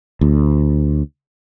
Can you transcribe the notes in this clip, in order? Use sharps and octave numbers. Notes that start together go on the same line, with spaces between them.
D2